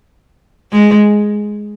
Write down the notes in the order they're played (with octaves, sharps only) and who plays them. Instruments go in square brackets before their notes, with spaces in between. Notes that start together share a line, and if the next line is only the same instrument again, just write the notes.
[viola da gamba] G#3